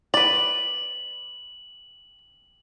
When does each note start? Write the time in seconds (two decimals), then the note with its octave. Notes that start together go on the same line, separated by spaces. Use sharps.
0.14 B4 D5 F#7